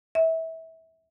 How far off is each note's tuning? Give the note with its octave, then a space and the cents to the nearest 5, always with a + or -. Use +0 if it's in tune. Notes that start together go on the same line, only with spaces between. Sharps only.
E5 -25